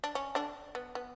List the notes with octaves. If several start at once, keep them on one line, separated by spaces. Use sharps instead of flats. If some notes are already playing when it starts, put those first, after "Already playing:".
D4
C#4
D3 D4
B3
B3